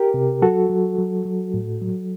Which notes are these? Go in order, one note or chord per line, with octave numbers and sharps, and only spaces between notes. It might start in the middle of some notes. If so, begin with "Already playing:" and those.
Already playing: G4 A#4
C3
F#3 F#4 A4
F#3
F#3
F#3
A2
F#3